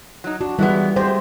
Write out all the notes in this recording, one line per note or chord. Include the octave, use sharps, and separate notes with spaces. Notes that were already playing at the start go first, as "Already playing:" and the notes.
F#3 D#4
D4 F#4
E3 G3 G#3 B3
G#3 A3 G4 C5